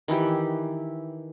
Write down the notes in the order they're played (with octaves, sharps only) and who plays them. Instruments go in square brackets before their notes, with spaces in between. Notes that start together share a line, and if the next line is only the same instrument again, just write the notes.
[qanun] D#3 E3 E4 G4